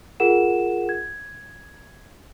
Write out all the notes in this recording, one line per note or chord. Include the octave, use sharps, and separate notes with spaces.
F4 G#4 A#4 F#5 E7
G#6